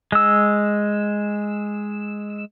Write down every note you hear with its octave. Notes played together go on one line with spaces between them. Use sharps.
G#3 E6